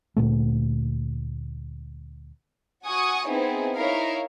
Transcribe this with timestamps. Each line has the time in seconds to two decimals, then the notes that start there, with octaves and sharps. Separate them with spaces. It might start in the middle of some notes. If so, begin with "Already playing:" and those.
0.16 D2 A#2 A3
2.85 F#4 F#5 G#5 C#6 D#6
3.27 B3 C4 D#4 E4 G#4
3.76 D#4 E4 A#4 C#5 F5